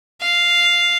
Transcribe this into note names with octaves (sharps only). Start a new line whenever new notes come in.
F5